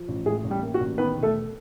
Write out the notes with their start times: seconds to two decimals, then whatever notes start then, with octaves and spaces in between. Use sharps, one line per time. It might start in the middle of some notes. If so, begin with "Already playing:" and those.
Already playing: F3
0.08 A1
0.26 A2 G#3 G#4
0.44 A1
0.50 G3 G4
0.63 A#3
0.74 F#4
0.81 A1
0.98 D#3 B3 B4
1.17 E1
1.23 A3 A4